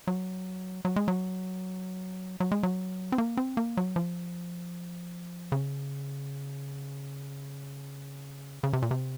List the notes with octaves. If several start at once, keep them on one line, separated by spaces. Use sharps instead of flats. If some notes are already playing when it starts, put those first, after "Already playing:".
F#3
F#3
G#3
F#3
F#3
G#3
F#3
C4
A#3
C4
A#3
F#3
F3
C#3
C#3
C3
A#2
C3